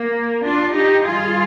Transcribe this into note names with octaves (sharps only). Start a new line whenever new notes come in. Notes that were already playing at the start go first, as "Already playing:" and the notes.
Already playing: A#3
D4 F4
D#4 G4
G2 D#3 G3 F4 G#4